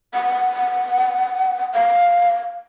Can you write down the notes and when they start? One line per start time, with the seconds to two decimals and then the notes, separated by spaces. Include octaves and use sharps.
0.14 F#5
1.73 F5